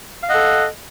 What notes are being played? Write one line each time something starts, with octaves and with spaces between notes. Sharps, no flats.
A4 D#5 F5 F#5